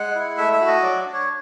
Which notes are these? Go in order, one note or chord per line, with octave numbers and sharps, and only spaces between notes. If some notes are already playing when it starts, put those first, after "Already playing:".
Already playing: G#3 F#5
E4
A3 E5
E5
F#4
D#5
F#3 D5
D4
C#5